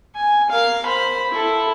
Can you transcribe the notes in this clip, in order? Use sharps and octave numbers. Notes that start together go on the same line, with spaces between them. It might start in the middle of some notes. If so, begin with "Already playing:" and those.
G#5
A#4 F5
C5 B5
E4 A4